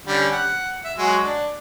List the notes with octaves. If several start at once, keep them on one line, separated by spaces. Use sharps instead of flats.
D3 G3 C#4
F#5
E5
F#3 G#3 F#4
D4